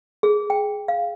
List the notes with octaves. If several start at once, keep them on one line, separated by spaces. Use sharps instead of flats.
G#4
G5
F5